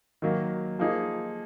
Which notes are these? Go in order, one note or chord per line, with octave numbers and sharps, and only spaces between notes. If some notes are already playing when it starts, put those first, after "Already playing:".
D#3 F#3 A#3
F3 A#3 D#4 G#4